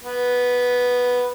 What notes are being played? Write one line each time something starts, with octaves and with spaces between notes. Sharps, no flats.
B3